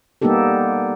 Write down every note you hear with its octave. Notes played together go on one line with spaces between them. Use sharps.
G3 A#3 B3 D#4 G4 A4